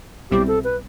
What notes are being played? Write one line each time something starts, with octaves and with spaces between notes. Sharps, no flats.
B1 B2 G3 C4 E4 G4
A4
B4